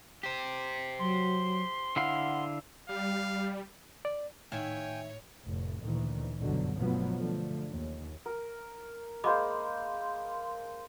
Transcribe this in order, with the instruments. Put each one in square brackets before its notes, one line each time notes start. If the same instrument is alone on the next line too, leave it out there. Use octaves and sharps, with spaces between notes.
[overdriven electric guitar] G4 C5
[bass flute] F#3 [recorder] C6
[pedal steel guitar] D3 E4 F5 [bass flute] F#5
[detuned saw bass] G3 [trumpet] F5
[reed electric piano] D5
[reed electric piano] A2 [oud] D#3 E4 F5 [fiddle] C#5 [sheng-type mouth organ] G5 G#5
[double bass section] F1 A2
D2 A#2 D#3 E3
G1 F#2 B2 D3 F#3
G1 B2 F3 F#3 A3 B3
D3 F3 A3
D#2
[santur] A#4
[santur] G#3 A#3 C5 [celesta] D#5 B5 D6